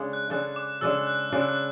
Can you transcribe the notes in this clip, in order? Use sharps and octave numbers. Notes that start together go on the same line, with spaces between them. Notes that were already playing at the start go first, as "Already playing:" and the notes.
Already playing: C#3 G#3 D4 A4
F#6
C#3 G#3 D4 A4 F#6
D6
C#3 G#3 D4 A4 E6
F#6
C#3 G#3 D4 A4 F#6
E6
F#6